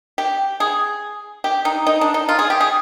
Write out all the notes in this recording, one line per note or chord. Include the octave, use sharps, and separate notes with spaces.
G4
G#4
G4
D#4
D#4
D4
D#4
F4
G#4
G4
G#4